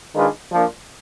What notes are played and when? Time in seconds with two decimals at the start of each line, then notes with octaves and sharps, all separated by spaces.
0.14 D#3 G#3 D4 F4 B4
0.51 F3 A#3 D4